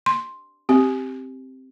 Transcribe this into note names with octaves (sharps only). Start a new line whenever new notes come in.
C6
C4 G4